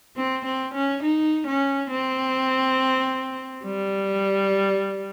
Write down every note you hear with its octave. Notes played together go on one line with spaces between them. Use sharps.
C4
C4
C#4
D#4
C#4
C4
G3